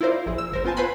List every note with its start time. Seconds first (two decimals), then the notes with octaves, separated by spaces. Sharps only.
0.01 E4 F4 A#4 C5 D5
0.26 A#1 E4 G#4
0.38 E6
0.52 G1 A#4 C5
0.65 B3 F4 C5 G#5 A5
0.77 B4 C5 F#5 G#5 B5 C6